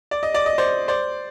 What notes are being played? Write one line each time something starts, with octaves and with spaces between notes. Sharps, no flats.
D5
D#5
D5
D#5
C5 D5
C5 D5